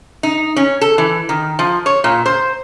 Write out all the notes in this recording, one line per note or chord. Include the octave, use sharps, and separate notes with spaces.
D#4
C#4
A4
E3
D#3
F3
C#5
A#2
C5